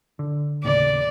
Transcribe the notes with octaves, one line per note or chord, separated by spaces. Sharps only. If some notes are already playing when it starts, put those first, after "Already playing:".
D3
D#2 A2 C#3 D5